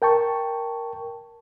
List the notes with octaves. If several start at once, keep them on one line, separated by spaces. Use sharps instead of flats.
A#4 G5 A5 C#6